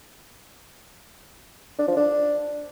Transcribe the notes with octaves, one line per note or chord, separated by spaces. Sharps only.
D4
F3
D4